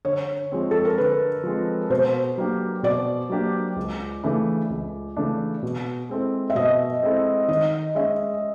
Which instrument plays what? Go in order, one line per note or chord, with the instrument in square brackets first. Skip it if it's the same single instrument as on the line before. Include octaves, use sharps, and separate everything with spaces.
[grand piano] D3 [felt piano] C#5
[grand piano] F3 G#3 C4
[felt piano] A4
A#4
[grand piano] D3 [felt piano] B4
[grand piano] F3 G#3 C4
[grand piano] B2 [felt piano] C5
[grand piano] F#3 A#3 D4 G4
[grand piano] B2 [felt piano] D5
[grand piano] F#3 A#3 D4 G4
C#2
C#3 E3 A3 D4
C#2
C#3 E3 A3 D4
B2
G#3 C4 E4 A4
[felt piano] E5
[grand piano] B2 [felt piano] D#5
[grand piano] G#3 C4 E4 A4
[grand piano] D#3 [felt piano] D#5
[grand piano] G#3 C#4 [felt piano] E5